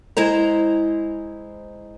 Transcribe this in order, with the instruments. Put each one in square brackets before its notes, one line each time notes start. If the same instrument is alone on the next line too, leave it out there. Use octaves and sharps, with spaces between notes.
[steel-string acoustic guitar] G#3 E4 C5 A#5